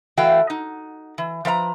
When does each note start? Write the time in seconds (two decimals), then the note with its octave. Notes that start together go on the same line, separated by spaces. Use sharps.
0.17 E3 A3 F#4 F5 G5
0.50 D#4
1.18 E3
1.45 F3 B4 E5 A#5